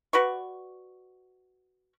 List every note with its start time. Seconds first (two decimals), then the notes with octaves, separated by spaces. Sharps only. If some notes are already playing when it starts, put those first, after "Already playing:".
0.13 F#4 B4 D5 C#6